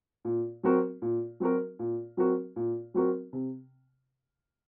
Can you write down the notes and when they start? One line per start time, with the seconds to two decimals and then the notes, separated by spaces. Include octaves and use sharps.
0.25 A#2
0.63 F#3 C4 F#4 A#4
1.02 A#2
1.40 F#3 C4 F#4 A#4
1.79 A#2
2.17 F#3 C4 F#4 A#4
2.56 A#2
2.94 F#3 C4 F#4 A#4
3.33 C3